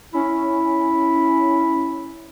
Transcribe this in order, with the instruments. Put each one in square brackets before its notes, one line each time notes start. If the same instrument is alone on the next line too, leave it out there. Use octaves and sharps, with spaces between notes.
[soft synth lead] C#4 [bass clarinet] E4